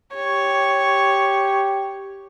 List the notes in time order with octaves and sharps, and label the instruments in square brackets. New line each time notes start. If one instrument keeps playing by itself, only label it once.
[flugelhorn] G4 [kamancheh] C#5